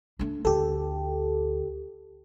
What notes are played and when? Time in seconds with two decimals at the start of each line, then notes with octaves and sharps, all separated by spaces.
0.19 A3 D4
0.45 D2 F4 G4 A4